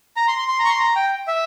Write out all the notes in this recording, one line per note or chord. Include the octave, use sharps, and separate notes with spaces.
A#5
C6
C6
C6
A#5
C#6
C6
A#5
G5
E5